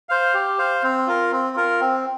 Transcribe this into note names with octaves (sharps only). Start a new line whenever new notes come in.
C5 F5
G4
C5 F5
C4
F4 A#4
C4
F4 A#4
C4